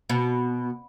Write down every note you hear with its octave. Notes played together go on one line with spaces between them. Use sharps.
B2